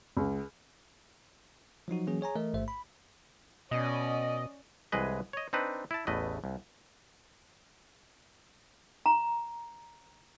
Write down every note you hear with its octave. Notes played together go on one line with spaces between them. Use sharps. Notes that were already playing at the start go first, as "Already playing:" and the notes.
C#2
F3 F#3 D#4 F#4
E3 F#3 A#3 C#4 G#4
G#4 C#5 G#5 A#5
E3 A3 A#4 D#5
A1 G#2 A3 C5 E5
B5
B2 C#4 D5 D#5
C2 E3 G#3 G#4 B4 D#5
C#5 D#5
C4 D4 D#4 B4
E4 A5
A1 E2 A3 B4 D#5
C2
A#5